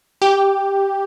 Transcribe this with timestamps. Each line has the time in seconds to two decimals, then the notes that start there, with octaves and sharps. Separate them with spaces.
0.22 G4